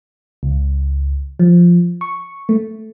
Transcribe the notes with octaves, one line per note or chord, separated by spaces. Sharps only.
C#2
F3
C#6
A3